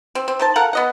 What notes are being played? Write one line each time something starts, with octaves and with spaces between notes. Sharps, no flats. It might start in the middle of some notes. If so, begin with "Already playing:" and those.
C4
C4
D#3 C5 A5
A4 A#4 F5 F#5
B3 D#5 F#5